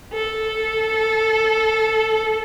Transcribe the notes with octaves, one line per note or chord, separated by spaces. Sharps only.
A4